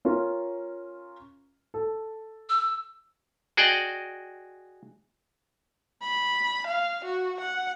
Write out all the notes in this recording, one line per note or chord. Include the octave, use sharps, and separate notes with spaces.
C#4 F4 A#4
A4
E6
F#4 G#4 D5 D#5 G5
B5
F5
F#4
F#5